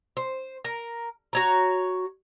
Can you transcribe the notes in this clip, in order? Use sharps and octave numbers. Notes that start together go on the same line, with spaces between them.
C5
A#4
F#4 C#5 A#5